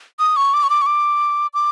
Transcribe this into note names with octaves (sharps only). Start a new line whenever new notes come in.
D#6
C#6
D6
C#6
D6
C#6
D6
D6